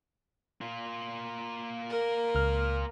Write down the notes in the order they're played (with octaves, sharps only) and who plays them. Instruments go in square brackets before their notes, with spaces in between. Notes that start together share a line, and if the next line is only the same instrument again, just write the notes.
[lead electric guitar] A#3 F4
[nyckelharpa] A#4
[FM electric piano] C#2 F6